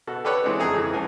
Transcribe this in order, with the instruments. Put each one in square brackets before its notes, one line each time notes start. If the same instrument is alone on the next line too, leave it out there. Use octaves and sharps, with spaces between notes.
[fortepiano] B2 F#4 A4
G4 A4 B4 C#5 D5
E3 G#3 C4 D4
F2 G#4 A4 G#5 A#5
F2 E3
C#2 G#5